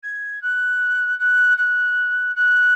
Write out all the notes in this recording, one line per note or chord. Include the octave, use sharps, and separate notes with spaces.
G#6
F#6
F#6
F#6
F#6